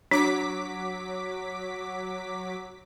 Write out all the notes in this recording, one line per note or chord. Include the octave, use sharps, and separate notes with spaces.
F#3 D4 D6 B6